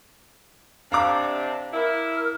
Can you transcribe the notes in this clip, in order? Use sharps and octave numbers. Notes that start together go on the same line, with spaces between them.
C3 D4 F5 A#5 D6
E4 A#4